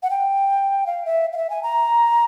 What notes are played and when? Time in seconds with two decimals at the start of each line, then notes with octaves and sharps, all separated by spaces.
0.02 F#5
0.10 G5
0.86 F5
1.05 E5
1.32 F5
1.37 E5
1.50 G#5
1.63 A#5